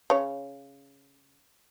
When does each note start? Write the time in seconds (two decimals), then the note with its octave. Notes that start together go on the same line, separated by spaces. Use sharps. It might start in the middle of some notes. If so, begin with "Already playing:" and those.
0.10 C#3 C#5